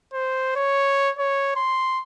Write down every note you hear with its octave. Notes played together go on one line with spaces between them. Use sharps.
C5
C#5
C#5
C6